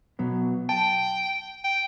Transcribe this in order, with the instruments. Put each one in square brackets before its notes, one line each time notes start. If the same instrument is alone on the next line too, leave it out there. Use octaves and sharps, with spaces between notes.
[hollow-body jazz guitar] B2 F#3 B3
[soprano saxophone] G5 [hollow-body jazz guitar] A5
[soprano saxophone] G5